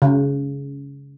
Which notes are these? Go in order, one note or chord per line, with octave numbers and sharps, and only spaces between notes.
C#3